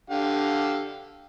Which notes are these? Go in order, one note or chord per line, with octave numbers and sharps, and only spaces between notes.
D3 G4 F5